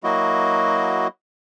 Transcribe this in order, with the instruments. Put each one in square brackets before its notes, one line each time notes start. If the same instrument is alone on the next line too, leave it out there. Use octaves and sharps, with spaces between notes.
[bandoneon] F#3 A#3 E4 F#4 D#5